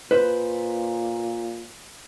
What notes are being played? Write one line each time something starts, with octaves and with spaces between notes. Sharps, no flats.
A#2 B4 C5